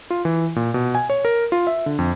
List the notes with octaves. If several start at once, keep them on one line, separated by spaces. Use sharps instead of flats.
F4
E3
A#2
B2
G#5
C#5
A#4
F4
E5
D3
F2